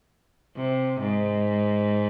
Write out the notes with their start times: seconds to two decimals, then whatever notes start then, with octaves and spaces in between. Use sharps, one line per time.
0.56 C3
1.00 G#2